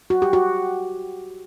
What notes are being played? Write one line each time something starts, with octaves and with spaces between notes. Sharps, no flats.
F#4
G4
F#4